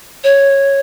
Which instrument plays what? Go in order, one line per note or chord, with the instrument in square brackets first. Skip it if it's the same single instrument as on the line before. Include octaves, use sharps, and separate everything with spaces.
[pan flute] C#5